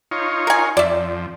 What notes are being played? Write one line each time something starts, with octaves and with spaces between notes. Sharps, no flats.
D#4 F4 C#5
A#4 G#5
F2 D5 E5